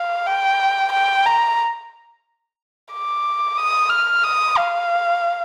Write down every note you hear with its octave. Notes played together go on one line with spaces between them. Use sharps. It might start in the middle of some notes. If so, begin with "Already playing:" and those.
Already playing: F5
G5
G5
A#5
D6
D#6
F6
D#6
F5